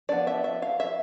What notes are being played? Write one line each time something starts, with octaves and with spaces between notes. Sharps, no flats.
F3 B3 D4 D5
E5
E5
F5
E5